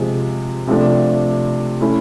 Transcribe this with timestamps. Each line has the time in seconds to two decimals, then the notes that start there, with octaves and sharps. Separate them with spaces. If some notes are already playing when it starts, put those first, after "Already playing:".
Already playing: C3 F3 G#3
0.67 C3 F3 A3 D4
1.81 A3 C#4 E4